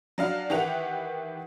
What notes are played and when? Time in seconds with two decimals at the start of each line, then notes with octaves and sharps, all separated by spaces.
0.18 F#3 D4 F5
0.50 D#3 E3 E4 G4 F#5 F7